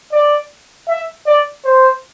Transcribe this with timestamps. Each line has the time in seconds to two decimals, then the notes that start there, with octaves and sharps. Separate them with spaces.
0.12 D5
0.88 E5
1.26 D5
1.64 C5